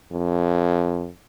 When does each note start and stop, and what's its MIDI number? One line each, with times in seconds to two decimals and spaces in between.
0.12 1.08 41